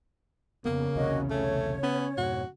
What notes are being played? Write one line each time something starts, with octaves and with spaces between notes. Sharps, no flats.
F2 C#3 A#3 B3
B1 E2 C3 F#4 C#5 D#5
A3 C#5
B3 C#4
F2 G#2 B2 F#4